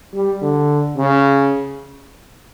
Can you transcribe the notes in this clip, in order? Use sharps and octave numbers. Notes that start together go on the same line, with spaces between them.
G3
D3
C#3